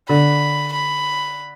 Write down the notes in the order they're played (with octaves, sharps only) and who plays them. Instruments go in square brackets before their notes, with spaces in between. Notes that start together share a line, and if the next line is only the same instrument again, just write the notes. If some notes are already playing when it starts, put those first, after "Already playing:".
[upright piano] D3 [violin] B5
[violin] B5